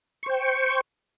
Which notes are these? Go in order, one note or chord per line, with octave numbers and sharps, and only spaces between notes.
C5 G5 C#6